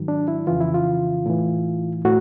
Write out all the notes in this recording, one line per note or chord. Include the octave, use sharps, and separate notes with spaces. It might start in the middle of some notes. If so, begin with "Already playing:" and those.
Already playing: G#2 D#3 F#3
D4
E4
F2 C#3 E3 F4
E4
F4
A2 E3
A2 F#4